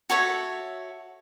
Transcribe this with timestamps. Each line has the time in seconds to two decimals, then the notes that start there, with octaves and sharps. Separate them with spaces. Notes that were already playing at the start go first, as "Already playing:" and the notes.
0.10 F#4 A4 C#5 E5